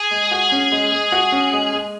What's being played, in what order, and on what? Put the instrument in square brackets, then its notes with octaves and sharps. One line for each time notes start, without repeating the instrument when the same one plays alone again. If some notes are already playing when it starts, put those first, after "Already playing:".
Already playing: [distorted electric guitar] G#4
[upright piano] G#3
F#4
C#4
G#3
G#3
F#4
C#4
G#3
G#3